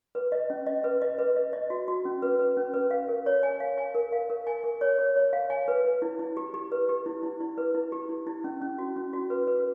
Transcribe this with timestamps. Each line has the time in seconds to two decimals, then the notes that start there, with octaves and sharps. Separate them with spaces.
0.15 B4
0.32 D#5
0.50 C#4
0.66 D#5
0.84 B4
1.02 D#5
1.19 B4
1.36 D#5
1.53 D#5
1.70 F#4
1.88 F#4
2.05 C#4
2.22 B4
2.39 B4
2.57 C#4
2.74 B4
2.91 F5
3.08 A#4
3.26 C#5
3.43 G#5
3.60 F5
3.78 G#5
3.95 A#4
4.12 F5
4.30 A#4
4.47 G#5
4.64 A#4
4.81 C#5
4.99 C#5
5.16 C#5
5.33 F5
5.50 G#5
5.68 B4
5.85 B4
6.02 E4
6.19 E4
6.37 G4
6.54 G4
6.72 B4
6.89 G4
7.06 E4
7.23 E4
7.41 E4
7.58 B4
7.74 E4
7.92 G4
8.09 E4
8.27 E4
8.44 C#4
8.62 C#4
8.78 F#4
8.96 C#4
9.13 F#4
9.30 B4
9.47 B4